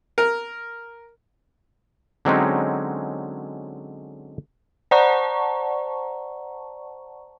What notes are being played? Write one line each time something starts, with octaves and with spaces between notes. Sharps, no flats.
A#4
D3 F#3 G#3 C4 C#4 D#4
C5 D5 F#5 A5 A#5 C#6